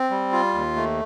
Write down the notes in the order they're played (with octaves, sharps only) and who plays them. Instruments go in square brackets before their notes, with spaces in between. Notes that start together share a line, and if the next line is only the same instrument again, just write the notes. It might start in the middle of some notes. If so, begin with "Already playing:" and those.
Already playing: [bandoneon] C4
G3
F4
D#2
A3